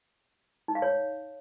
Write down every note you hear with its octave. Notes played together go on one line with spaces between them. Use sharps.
D#4
F5
C#5